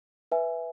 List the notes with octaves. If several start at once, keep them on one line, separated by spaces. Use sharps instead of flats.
B4 E5 G#5